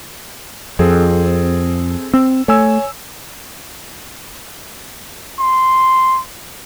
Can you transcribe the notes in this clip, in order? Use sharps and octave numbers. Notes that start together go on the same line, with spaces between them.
F2 C4 G#4 A4
C4 E6
A3 C#5 G#5 E6
C6